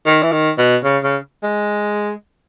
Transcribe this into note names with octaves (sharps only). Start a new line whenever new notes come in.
D#3
E3
D#3
B2
C#3
C#3
G#3